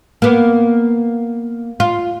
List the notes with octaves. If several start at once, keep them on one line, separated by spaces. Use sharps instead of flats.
A#3 B3
F4